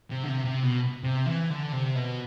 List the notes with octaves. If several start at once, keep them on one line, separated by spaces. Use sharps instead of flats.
C3
D3
C3
C3
B2
C3
E3
D3
C3
B2